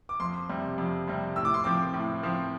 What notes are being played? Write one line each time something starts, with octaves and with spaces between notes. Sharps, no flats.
D6
F2 C6
C3 G3
F2
C3 G3
A2 E6
D6
C6
F3 C4 D6
A2
F3 C4